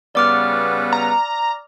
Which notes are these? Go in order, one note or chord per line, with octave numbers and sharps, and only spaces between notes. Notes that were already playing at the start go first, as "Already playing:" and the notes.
C#3 G3 B3 D5 D6 F6
A#5